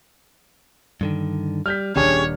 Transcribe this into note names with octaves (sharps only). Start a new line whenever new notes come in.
G2 D3 D#3
G3 F6 G6 B6
D#1 C#4 D4 G4 G#4 C#5